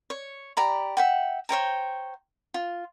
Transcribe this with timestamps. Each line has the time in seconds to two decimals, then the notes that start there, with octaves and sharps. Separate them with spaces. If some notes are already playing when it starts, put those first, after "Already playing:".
0.10 C#5
0.57 G4 D5 A#5 B5
0.97 E5 F#5 G5
1.49 C5 C#5 G5 A#5
2.54 F4